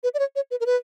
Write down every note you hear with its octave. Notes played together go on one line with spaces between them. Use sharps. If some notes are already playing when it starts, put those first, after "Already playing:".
B4
D5
C#5
C#5
B4
A#4
B4